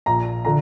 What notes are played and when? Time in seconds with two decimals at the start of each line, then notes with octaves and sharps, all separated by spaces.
0.06 A#1 A#2 F3 A#5
0.45 D3 F3 A#5